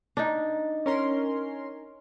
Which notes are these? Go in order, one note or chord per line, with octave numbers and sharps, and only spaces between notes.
D4 D#4
C#4 A#4 C6